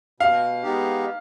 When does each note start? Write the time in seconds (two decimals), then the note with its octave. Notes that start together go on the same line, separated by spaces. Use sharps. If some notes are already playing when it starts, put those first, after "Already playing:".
0.20 B2 F5
0.63 G#3 B3 D#4 G4